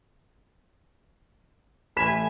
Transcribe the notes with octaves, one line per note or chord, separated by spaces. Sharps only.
A1 A3 G#5 B5 B6 E7